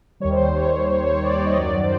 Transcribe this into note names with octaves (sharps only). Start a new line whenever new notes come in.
D#2 D#3 G3 C#5
C5
C#5
C#5
C#5
D5
D#5
F#2 D#3 F#3 D5
C5